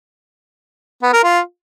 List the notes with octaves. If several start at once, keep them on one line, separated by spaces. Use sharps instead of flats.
B3
A#4
F4